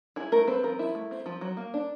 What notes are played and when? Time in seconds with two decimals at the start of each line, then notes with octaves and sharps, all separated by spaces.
0.16 E4 G#4
0.32 A3 A#4
0.48 C4 B4
0.63 F3 A#4
0.79 E4
0.95 A3
1.11 C4
1.26 F3
1.41 F#3
1.57 A#3
1.74 D4